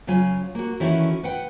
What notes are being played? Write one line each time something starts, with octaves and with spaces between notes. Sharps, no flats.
C#3 F#3 F4 G#5
A#3 F#4
D#3 E3 C#4 E4 F#4 A4
B4 F#5 G5